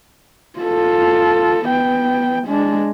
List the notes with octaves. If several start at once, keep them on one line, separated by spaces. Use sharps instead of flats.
F4 A4
B3 G5
G#3 D4